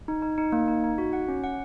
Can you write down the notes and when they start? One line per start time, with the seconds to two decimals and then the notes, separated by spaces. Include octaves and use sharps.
0.08 D#4
0.22 D#4
0.38 D#4
0.52 A#3
0.68 D#4
0.84 D#4
0.98 F#4
1.13 F#5
1.28 C#4
1.44 F#5